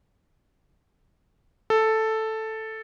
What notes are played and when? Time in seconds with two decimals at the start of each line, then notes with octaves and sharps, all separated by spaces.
1.70 A4